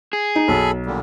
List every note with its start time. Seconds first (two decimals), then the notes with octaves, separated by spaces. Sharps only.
0.13 G#4
0.35 D#4
0.48 B1 A4 B5
0.86 A#2 D3 G3